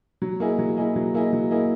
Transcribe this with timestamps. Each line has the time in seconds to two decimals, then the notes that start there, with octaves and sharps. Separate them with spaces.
0.22 F#3
0.40 A#3 E4 G#4 D#5
0.59 F#3
0.77 A#3 E4 G#4 D#5
0.96 F#3
1.14 A#3 E4 G#4 D#5
1.33 F#3
1.51 A#3 E4 G#4 D#5